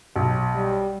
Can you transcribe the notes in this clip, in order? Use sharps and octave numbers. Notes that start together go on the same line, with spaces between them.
B1
G3